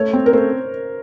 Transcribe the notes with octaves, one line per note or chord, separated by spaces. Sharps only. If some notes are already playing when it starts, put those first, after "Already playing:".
Already playing: A3 C#5
C4
A#4
A3 C5